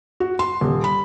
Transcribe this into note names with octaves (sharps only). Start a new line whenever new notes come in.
F#4
C6
D#1
B5